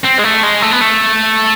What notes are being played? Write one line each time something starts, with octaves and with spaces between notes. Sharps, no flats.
C4
G#3
A3
G#3
A3
B3
A3